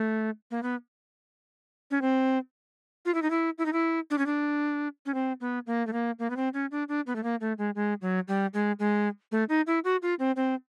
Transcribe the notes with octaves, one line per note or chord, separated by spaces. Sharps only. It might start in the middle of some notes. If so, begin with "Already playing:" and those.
Already playing: A3
A#3
B3
C#4
C4
F4
E4
D#4
E4
E4
D#4
E4
D4
C#4
D4
C#4
C4
B3
A#3
A3
A#3
A#3
B3
C4
C#4
D4
D4
B3
A3
A#3
A3
G#3
G#3
F#3
G3
G#3
G#3
A3
D#4
E4
F#4
F4
C4
C4